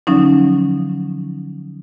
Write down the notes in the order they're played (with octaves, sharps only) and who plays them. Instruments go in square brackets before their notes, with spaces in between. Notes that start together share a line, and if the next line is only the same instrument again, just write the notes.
[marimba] D3 F3 F#3 C#4 D#4